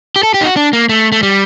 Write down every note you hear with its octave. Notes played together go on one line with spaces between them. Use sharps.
G4
A4
G4
D#4
F#4
D4
A#3
A3
A3
G3